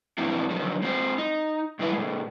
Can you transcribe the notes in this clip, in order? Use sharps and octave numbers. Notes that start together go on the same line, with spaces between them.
G#2 E3 F3 C4 D4 E4
D3 D#3 F3 F#3
G#3 C4 F4 C5
D#4
G2 D#3 E4 B4 E5
A#2 G#3